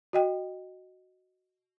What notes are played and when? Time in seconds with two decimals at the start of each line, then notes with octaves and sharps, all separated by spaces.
0.13 F#4 D#5 G5